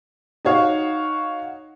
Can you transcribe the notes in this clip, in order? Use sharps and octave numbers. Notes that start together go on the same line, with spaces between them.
D#4 F#4 C#5 F5